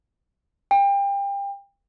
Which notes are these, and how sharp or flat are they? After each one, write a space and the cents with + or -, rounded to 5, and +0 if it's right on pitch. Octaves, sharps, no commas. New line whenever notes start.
G5 +30